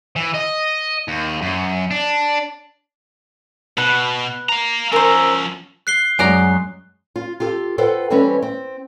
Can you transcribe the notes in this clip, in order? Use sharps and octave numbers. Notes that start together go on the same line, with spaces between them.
E3
D#5
D#2
F#2
D4
B2 B4 F#5
F5 A#5
F3 C#4 A#4 C5 E6
F#6 C7 G7
F#2 F#3 G#3 D5 G#5 A#5 F#6
F4
F4 G4 A4
F4 A4 B4 C5 F#5 G5
E3 G3 C4 C#4 A4 B4
C4